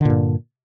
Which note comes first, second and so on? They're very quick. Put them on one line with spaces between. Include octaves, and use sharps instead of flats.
D3 A#2 G2